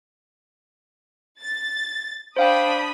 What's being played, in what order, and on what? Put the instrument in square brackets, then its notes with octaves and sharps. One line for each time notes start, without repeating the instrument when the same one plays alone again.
[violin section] A6
[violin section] D4 B5 D#6 [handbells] C5 F5 G5